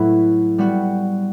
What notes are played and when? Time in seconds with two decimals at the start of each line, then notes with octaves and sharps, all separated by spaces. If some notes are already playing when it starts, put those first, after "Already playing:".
Already playing: A2 F#3 A3 E4 B4
0.58 G3 B3 F#4